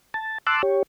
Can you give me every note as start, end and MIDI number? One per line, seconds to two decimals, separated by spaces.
0.14 0.38 81
0.47 0.62 81
0.47 0.62 84
0.47 0.62 86
0.47 0.62 88
0.47 0.62 90
0.63 0.83 67
0.63 0.83 73